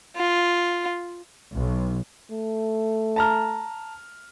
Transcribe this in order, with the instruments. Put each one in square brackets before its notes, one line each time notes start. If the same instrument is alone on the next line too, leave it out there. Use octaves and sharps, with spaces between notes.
[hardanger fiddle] F4
[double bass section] B1
[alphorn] A3
[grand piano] A5 A#5 F6